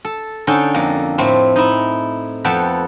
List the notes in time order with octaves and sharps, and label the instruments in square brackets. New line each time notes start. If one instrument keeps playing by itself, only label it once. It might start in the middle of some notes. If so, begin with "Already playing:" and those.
[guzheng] A4
D3 C#4 D#4 A4 G5
F2 A#3 A4
A2 A3 C4
D#4 E4
F2 B3 A4 G5 A5 B5